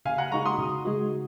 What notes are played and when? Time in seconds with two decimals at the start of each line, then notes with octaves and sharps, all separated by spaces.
0.05 C#3 F5 G#5
0.18 F#5 A#5
0.32 G#3 D#4 F#4 A#5 C#6
0.45 C6 D#6
0.58 C#3
0.85 G#3 D#4 F#4